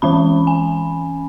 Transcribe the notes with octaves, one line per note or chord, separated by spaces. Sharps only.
E3 G#3 C#4 B5
G#5